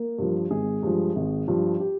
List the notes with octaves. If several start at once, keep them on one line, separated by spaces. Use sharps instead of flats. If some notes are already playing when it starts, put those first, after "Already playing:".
Already playing: A#3 A#4
G2 F3
G#1 G#3 G#4
G2 F3
G#1
G2 F3
G4